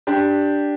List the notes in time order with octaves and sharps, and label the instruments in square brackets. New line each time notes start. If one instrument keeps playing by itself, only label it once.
[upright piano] D4 G4